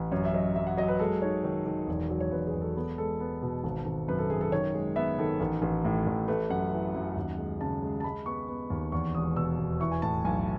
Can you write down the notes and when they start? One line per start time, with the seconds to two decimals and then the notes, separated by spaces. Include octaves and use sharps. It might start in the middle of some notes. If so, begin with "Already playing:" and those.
Already playing: A1
0.12 F#2 C#5
0.25 E5
0.34 F#3 D#5
0.56 F#2 E5
0.67 F#5
0.77 F#3 D#5
0.88 B4
0.99 G#3 A4
1.22 D#4 C#5
1.44 D#3 C#5
1.66 D#3
1.88 E1
2.10 F#3
2.20 C#5
2.32 E1 B4
2.47 G#4
2.54 E1
2.61 A4
2.76 B3 A4
2.98 G#3 A4
3.20 B3
3.42 B2
3.64 G#1
3.86 G#1
4.08 F#2 B4
4.19 A4
4.30 F#2 G#4
4.41 A4
4.52 D#3 C#5
4.74 G#3
4.96 B3 E5
5.19 D#3 A4
5.40 A1
5.62 A1
5.85 A2
6.06 A1
6.28 A3 B4
6.50 F#2 F#5
6.72 E3
6.95 F#2
7.16 D#2
7.38 G#3
7.61 C#3 A5
7.82 G#3
8.00 A5
8.04 G#3 B5
8.26 B3 C#6
8.49 B3
8.70 D#2
8.92 E2 C#6
9.14 E1 D#6
9.36 B2 E6
9.58 E1
9.80 E3 C#6
9.91 G#5
10.02 A2 A5
10.24 B1 G#5